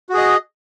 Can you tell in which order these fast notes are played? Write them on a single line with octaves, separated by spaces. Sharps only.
F#4 G#4 D#5